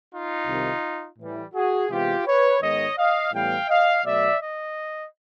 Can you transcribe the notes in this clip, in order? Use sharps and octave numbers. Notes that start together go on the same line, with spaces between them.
D#4 F4
C2 C3 D#3
A2 E3 G3
F#4 G#4
C3 E3 G#3 B3 F4 G4
B4 C#5
G#2 D#3 G#3 B3 C#5 D#5
D#5 F5
A2 E3 G3 B3 F5 G5
D#5 F5
B2 F#3 A3 D5 E5
D#5